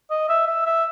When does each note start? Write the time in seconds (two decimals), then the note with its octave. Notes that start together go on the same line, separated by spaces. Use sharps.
0.10 D#5
0.29 E5
0.47 E5
0.66 E5